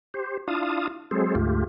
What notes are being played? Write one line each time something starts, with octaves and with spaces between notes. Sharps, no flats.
G4 C5
D4 E4 F4 F5 A5 D#6
F#3 G#3 C4 G#4 A4 C5
D2 G#2 A3 F4 G4